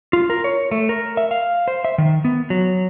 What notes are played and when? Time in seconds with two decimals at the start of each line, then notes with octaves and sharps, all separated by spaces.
0.13 F4
0.30 A#4
0.44 C#5
0.71 A3
0.89 A#4
1.17 E5
1.31 F5
1.68 C5
1.85 E5
1.98 D#3
2.25 B3
2.50 F#3